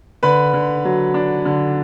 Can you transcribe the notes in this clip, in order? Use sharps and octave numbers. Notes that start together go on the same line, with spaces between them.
D3 B4 B5
D3
F#3
D4
D3